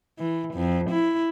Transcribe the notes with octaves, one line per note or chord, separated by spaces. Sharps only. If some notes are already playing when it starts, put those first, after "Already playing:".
E3
F2
E4